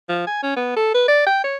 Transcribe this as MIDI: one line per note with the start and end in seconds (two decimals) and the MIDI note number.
0.09 0.25 53
0.27 0.41 80
0.43 0.56 61
0.56 0.72 59
0.76 0.92 69
0.94 1.08 71
1.08 1.22 74
1.26 1.39 79
1.44 1.57 73